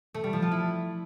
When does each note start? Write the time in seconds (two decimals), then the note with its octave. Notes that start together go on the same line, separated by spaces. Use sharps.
0.14 A3
0.24 G3
0.33 F3
0.42 F4
0.52 E4